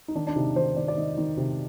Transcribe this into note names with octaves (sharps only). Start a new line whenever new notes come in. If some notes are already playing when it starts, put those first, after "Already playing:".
D#4
D#3 D4
D4
C3 D#4
D#3 C5
D#3 D5
D5
D#3 D#5
D#3
C3